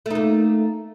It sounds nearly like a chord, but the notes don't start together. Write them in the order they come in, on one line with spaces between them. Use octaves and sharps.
A3 D#4 A#3